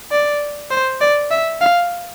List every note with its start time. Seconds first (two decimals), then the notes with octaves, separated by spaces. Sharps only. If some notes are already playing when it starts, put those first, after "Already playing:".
0.12 D5
0.71 C5
1.01 D5
1.31 E5
1.61 F5